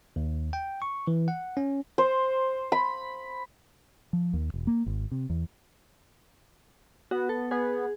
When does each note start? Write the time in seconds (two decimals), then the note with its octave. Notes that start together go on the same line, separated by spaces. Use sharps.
0.16 D#2
0.53 G5
0.82 C#6
1.07 E3
1.28 F#5
1.57 C#4
1.98 C5
2.72 B5
4.13 F3
4.33 D#2
4.54 E1
4.67 A#3
4.86 G#1
5.12 C3
5.30 E2
7.11 B3 F#4
7.29 A4
7.51 B3 G#4